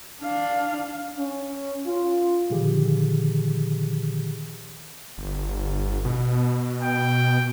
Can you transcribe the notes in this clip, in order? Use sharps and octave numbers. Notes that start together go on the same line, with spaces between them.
D4 F5
C#4
F4
A#2 D3 D#3 F3 G4 G#4
G1
B2
G5